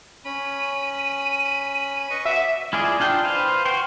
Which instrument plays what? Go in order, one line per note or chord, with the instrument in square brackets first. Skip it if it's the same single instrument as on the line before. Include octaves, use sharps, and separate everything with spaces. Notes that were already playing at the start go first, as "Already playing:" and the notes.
[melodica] C#4 B5 [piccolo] D#7
[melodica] B4 D#5 C#6
[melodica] F#4 D6 [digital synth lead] E5 [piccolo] E7
[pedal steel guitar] E4 F4 G#4 D5 D#5
D4 F4 G5
B4 C5 F5
F#4 G5 C6